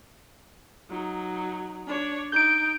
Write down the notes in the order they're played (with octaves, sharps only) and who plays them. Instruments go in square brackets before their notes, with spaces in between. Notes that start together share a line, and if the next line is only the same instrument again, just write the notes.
[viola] F#3 D#4
D4 C#5
[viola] D#4 [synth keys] G6 D7